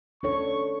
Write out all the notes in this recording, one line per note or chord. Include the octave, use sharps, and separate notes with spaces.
D4 A4 C#5 C#6